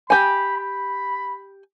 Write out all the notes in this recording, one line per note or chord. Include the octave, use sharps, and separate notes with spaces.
G4 G#5 B5
B5